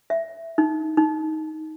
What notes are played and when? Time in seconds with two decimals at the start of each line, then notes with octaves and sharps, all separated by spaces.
0.10 E5
0.58 D#4
0.97 D#4